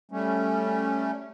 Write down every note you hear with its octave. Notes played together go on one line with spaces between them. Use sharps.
G3 A3 C#4